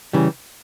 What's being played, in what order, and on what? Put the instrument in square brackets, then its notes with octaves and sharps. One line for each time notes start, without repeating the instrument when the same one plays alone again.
[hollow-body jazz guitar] C#3 E3 G3